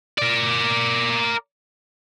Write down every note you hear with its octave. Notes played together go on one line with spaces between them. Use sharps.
A#4 D5